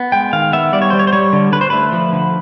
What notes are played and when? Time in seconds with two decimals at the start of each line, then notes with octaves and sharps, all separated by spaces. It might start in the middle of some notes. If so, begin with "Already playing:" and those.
Already playing: B3
0.12 G#3 G5
0.33 D#3 F5
0.53 B3 E5
0.73 G3 D5
0.82 C#5
0.90 G3 C5
0.99 C#5
1.07 C5
1.13 G3 C#5
1.33 D3
1.52 D3 B4
1.61 C5
1.70 A3 B4
1.92 F3
2.13 D3